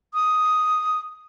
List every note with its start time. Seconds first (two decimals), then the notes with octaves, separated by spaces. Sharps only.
0.14 D#6